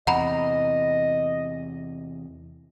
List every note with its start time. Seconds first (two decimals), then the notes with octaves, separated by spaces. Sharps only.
0.07 E2 C3 D#5 F#5 A#5 B5